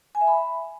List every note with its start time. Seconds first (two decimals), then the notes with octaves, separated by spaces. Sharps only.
0.15 G#5
0.21 E5
0.27 B5